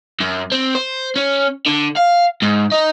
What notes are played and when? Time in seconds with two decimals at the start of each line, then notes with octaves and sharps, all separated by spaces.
0.20 F#2
0.52 C4
0.75 C5
1.16 C#4
1.66 D3
1.96 F5
2.42 G#2
2.72 D#4